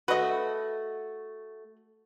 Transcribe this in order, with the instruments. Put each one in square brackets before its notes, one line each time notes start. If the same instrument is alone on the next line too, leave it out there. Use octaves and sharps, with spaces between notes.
[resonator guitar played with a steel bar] A3 F#4 [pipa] B4 D#5